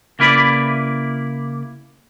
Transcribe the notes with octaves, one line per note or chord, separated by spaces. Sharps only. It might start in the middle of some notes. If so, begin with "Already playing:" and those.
C#3 A#3 E4 B4 D5